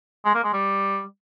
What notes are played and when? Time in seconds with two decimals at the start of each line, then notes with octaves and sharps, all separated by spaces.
0.25 G#3
0.34 A#3
0.44 G#3
0.53 G3